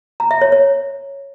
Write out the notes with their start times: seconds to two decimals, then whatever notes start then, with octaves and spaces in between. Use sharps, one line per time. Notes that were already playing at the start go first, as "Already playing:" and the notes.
0.20 A#5
0.31 E5
0.41 C#5
0.52 C#5